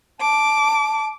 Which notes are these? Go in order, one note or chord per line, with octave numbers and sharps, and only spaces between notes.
A5 D6